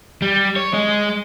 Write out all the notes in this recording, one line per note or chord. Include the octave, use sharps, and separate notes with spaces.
G3
C#5
G#3 D#5